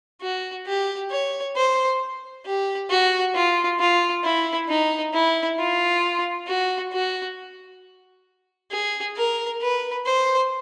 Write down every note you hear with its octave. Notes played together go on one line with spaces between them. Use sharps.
F#4
G4
C#5
C5
G4
F#4
F4
F4
E4
D#4
E4
F4
F#4
F#4
G#4
A#4
B4
C5